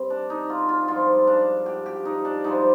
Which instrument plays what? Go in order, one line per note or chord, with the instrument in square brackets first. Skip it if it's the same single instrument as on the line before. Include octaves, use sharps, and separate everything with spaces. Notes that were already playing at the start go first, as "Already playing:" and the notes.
Already playing: [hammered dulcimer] G2 G3 C4
D4
D#4
F4
F4
G2 F3 G#3 F4
D4
G4
G4
D#4
D4
G2 F3 G#3 D#4